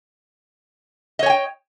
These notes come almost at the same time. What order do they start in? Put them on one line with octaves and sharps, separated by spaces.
D#5 C#5 G#5 G5